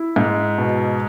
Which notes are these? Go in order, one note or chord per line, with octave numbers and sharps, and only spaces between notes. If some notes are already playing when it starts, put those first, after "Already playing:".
Already playing: E4
G#2
B2